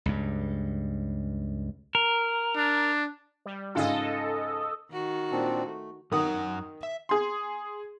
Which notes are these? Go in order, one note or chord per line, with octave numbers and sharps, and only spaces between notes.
C#2 G2
A#4
D4
G3
G#2 C#3 F4 A4 D#5
D#3 F#4
A#2 C4 D4
A3
F#2 D#3 F#5 A#5 D#6
E5
G#4 C6